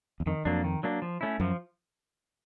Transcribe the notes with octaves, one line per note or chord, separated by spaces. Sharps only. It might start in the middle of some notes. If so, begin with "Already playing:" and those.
E2
F2 D#3
F2 F#3 A#3 D4
D#3
F#3 A#3 D4
F3
A3 C#4 E4
F#2 F3